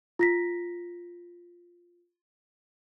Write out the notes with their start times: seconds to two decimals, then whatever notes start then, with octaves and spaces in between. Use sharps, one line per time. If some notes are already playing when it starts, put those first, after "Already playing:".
0.19 F4 A#6 B6